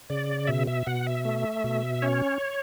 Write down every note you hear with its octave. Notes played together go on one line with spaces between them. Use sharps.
C#3 D5
B2 E5
E5
B2 F#5
E5
A3
B2
C#4 C#5